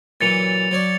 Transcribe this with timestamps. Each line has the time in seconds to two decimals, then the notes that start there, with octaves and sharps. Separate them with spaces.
0.21 A#2 E3 F#3 A6 C#7 F7
0.71 F#3 C#5 D5